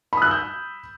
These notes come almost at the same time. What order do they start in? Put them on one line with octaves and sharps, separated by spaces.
B5 D#6 F#6 E6 G6